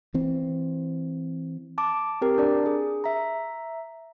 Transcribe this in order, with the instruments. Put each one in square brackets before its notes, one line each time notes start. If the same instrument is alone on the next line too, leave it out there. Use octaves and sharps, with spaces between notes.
[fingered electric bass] E3 C4
[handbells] A5 D6
C4 G4 A#4
D4 A#4 D5
G#4
E5 A#5